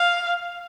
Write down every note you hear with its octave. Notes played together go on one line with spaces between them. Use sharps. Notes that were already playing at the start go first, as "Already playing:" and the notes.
Already playing: F5